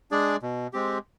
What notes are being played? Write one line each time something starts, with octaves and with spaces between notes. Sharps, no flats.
G#3 D4 G#4 D5
B2
G#3 C4 G4